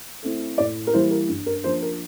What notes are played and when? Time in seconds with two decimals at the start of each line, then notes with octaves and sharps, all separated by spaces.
0.23 A3 C4 E4
0.58 A2 D5
0.87 A#4
0.93 E3 G3 A#3 E4 C5
1.11 A#4
1.29 G2
1.46 A#4
1.64 F3 A#3 D4 C5
1.82 A#4